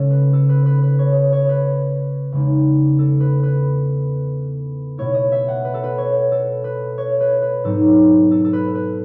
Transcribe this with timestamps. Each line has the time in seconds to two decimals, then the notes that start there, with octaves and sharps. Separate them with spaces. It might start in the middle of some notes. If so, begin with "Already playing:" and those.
Already playing: C#3 G#3 C#4 A4
0.11 B4
0.33 A4
0.49 B4
0.66 B4
0.83 B4
0.99 C#5
1.33 C#5
1.49 B4
2.32 E2 C#3 G#3 D#4
2.99 A4
3.20 B4
3.43 B4
4.98 B2 A3 E4 C#5
5.15 D#5
5.32 E5
5.48 F#5
5.65 B4
5.74 A4
5.84 B4
5.98 C#5
6.32 A4
6.64 B4
6.98 C#5
7.21 B4
7.42 B4
7.64 G#2 F#3 B3 D#4 A4
8.31 A4
8.45 A4
8.53 B4
8.75 B4